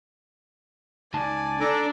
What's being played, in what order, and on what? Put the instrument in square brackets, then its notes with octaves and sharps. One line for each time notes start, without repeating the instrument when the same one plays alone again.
[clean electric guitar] C#2 D#4 A5 [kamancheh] D5 G#5
[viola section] D4 [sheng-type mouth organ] A4 A#5 D6